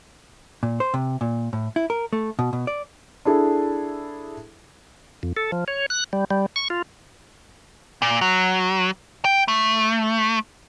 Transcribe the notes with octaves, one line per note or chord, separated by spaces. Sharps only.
A#2
C5
C3
A#2
A2
E4
A#4
A3
B2
B2
D5
D4 E4 G#4 A4
F2
A4
F3
C#5
F#6
G3
G3
C#6
F4
A#2
F#3
G5
A3